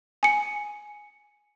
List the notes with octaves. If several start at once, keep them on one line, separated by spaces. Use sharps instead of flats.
G#5 C#7